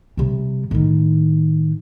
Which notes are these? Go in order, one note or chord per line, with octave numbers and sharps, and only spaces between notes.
C3 G3
A2 D#3